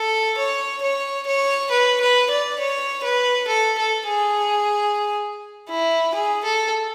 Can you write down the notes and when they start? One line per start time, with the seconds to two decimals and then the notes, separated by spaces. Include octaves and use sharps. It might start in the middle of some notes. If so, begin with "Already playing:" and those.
Already playing: A4
0.38 C#5
0.82 C#5
1.27 C#5
1.71 B4
2.01 B4
2.30 D5
2.60 C#5
3.04 B4
3.48 A4
3.78 A4
4.08 G#4
5.70 E4
6.15 G#4
6.44 A4